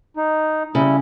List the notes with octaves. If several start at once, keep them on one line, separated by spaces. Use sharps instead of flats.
D#4
C#3 G3 E4